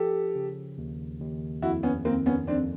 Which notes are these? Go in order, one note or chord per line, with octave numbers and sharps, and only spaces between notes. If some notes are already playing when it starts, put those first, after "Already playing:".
Already playing: F3 G4 A4
C#3
D#2
D#2
F2 E4 F#4
B3 C#4
D#3 A#3 C4
B3 C#4
F2 C4 D4